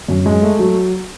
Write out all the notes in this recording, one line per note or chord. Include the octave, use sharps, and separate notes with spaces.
F#2
G#3
A3
F#3